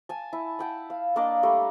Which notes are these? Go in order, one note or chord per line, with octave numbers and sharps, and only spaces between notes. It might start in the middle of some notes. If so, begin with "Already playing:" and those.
G#5 A5
E4
F#5 G5 A5
F5
A#3 D4 D5 D#5
G3 A3 A#4